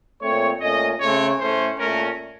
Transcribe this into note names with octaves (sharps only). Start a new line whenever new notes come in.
A#2 A3 C4 C#5
A#2 A3 C#4 D#5
C#3 A3 C4 C#5
A2 A3 C#4 C5
A#2 A3 C#4 A#4